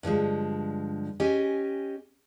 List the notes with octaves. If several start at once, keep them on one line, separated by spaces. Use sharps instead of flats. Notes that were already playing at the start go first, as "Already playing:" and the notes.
G2 D3 F3 G#3
C#4 G4 D#5 G#5